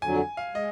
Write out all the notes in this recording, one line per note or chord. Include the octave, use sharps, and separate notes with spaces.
F2 D3 F#3 G#5
F5
G#3 D#5